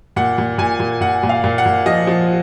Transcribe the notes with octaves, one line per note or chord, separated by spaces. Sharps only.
A#2 F#5
A#2
A#2 G#5
A#2
A#2 F#5
A#2
F5
A#2
F#5
A#2
F3 D#5
F3